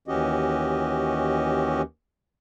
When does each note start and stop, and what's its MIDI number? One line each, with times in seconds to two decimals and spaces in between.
0.08 1.82 39
0.08 1.82 52
0.08 1.82 61
0.08 1.82 66
0.08 1.82 67
0.08 1.82 75